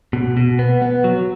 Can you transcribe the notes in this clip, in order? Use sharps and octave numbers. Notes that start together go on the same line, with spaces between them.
B2
B2
B3
B3
F#3